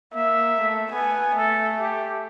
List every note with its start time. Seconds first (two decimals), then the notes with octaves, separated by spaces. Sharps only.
0.14 A#3 E5
0.61 A3
0.92 B3 G#5
1.36 A3 A4
1.80 G4